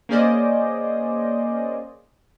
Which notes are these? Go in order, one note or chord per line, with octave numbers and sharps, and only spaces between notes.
A#3 C#4 G#4 C5 D5 D#5